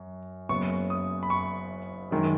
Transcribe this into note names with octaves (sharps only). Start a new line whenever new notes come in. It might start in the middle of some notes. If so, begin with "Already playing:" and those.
Already playing: F#2
F#1 F#2 C#3 B3 C#6
D#6
B5
C#6
F#2 D#3 G#3